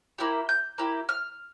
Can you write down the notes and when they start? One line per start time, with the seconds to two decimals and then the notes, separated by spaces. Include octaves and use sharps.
0.18 A#3 E4 G4
0.49 G6
0.78 A#3 E4 G4
1.09 F6